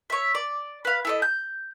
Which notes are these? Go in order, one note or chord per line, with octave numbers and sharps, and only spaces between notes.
C#5 E5
D5
B4 F5
E4 A4 D#5
G6